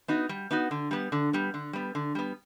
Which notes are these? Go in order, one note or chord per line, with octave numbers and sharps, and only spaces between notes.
B3 D#4 F#4
G3
B3 D#4 F#4
D3
G3 B3
D3
G3 B3
D3
G3 B3
D3
G3 B3